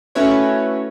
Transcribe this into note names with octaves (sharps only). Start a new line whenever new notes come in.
A3 C#4 E4 F#4 B4 C#5